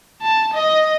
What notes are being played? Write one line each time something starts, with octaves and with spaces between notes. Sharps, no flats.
A5
D#5